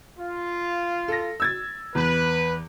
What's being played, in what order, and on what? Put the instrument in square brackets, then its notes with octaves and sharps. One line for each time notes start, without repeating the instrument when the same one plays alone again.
[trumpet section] F4
[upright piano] A4 A#6
E6 G#6 A6
[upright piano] E2 [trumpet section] B4